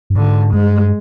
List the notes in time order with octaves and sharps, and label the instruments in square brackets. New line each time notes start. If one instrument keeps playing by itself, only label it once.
[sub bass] G2
[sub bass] G#2 [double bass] D3
[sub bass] G2 [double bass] G#3